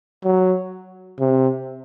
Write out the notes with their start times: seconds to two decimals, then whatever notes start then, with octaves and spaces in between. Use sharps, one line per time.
0.24 F#3
1.19 C3